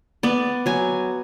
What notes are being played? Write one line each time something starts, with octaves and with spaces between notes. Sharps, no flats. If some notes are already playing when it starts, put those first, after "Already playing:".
B3 D5
F#3 G#5